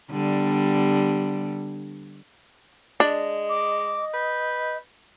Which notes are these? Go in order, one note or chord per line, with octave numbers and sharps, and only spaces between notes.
D3 G3 B3
G#3 D4 D#5
D6
B4 G6